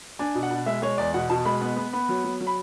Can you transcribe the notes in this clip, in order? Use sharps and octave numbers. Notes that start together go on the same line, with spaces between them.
D4 G#5
B2
F#5
B2
G#3 E5
G#3 C#5
E2 D5
B2 F#5
B2 A5
G#3 B5
B3
B3
B3
F#3
F#3
F#3
B5